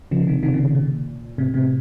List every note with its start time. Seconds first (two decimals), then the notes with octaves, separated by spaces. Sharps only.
0.11 C#3 F3
0.27 C3 D#3
0.43 C3 D#3
0.54 A#2 C#3
0.75 A#2
1.38 A2 C3
1.54 A2 C3